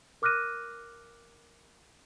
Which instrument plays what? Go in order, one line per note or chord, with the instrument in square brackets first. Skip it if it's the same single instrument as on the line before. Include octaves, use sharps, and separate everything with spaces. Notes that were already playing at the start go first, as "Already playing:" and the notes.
[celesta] A#4 D6 F6 F#6 A#6 D#7